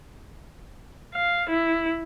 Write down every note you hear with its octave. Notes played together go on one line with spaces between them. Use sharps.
F5
E4